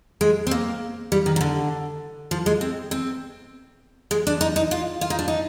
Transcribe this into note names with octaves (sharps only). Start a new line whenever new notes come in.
G#3
C4
A#3
G3
D#3
D#3
D3
F3
G#3
C4
C4
G#3
D4
D#4
D#4
F4
F4
D#4
D4
D#4